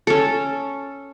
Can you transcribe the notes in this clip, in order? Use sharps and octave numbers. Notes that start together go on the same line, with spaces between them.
C#4 A4